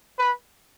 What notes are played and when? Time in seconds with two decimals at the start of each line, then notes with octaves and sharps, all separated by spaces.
0.18 B4